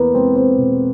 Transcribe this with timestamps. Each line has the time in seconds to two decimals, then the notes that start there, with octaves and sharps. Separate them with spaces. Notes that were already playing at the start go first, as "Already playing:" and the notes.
Already playing: E2 A#3 B3 A#4 B4
0.14 G#3 C4 C5
0.36 C4 C5
0.58 B2